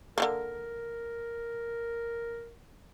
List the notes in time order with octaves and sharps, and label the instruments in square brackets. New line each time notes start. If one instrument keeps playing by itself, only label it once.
[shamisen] D3 F3 A#3 [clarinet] A#4